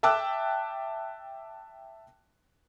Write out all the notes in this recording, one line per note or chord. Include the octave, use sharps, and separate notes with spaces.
E5 G5 A5 D6 E6 F#6